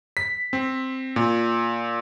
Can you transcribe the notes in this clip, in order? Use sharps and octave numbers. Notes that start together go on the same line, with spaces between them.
B6
C4
A#2